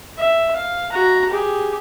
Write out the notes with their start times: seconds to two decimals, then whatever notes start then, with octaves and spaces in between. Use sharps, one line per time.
0.18 E5
0.56 F5
0.92 F#4 A#5
1.30 G4 G#4